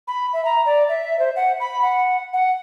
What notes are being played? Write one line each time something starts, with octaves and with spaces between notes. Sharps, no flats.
B5
E5
A#5
D5
E5
C5
F#5
B5
F#5
F#5